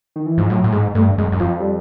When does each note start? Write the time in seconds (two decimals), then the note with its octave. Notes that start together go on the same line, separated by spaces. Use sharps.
0.16 D#3
0.26 E3
0.38 G#2 F3
0.50 A2 F#3
0.64 A2
0.72 G#2 G#3
0.95 G2 A3
1.18 F#2 G#3
1.32 F#2
1.40 F2 F3
1.60 G3